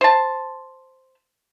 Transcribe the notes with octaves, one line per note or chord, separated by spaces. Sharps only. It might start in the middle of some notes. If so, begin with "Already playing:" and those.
C5 A5